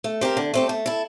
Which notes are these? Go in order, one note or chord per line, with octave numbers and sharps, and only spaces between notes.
A3
C4 G4 A#4
D3
A3 C4 G4
A3
E4 A4